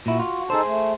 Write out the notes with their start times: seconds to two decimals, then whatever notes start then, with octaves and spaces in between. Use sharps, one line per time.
0.06 A#2 E4 F#4
0.20 F4
0.50 D#4 G#4 A4 C5 A5
0.65 A3